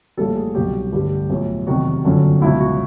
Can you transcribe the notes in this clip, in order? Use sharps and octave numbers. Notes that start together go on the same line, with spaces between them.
A#1 A2 E3 G3 A4
G#4
C2 B2 F#3 G4
A1 G2 D3 G3
B1 A2 F3
F1 E2 C3 D#3 F#3 F#4
G1 F#2 D3 F3
C#2 B2 F#3 E4
F#4